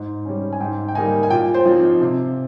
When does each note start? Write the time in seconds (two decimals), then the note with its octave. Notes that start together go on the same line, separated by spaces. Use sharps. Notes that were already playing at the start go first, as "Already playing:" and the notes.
Already playing: G#2
0.25 G3 C#4
0.52 G#5
0.60 G#2 G5
0.88 G5
0.95 G3 A#3 D#4 G#5
1.23 G#5
1.30 A#2 G5
1.54 C5
1.65 F3 C4 D#4
2.01 C3